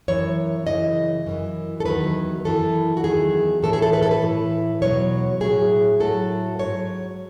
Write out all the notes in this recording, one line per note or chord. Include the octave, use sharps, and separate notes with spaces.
F#2 E3 C#5
F#2 C#3 E3 D#5
F#2 E3
A4
E2 D#3 F#3 B4
F#2 E3 A4
F#4
E2 D#3 F#3 G#4
A2 E3 A4
G#4
A4
B4
A4
B4
A2 E3
E2 B2 F#3 C#5
A2 F#3 G#4
A2 F#3 A4
G#2 F#3 C#5